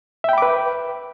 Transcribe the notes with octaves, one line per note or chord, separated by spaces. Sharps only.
B4 E5 G5 B5 D6